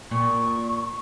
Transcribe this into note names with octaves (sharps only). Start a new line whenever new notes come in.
A#2 C#6